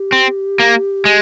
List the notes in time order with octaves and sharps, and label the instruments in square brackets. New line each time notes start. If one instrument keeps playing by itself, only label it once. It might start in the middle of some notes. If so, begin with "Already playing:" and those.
Already playing: [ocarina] G4
[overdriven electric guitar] C4
A#3
G#3